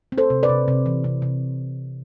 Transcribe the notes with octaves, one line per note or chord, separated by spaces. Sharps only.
C4
A4 C5
C3
B4 D5
C3
C3
E3
C3
C3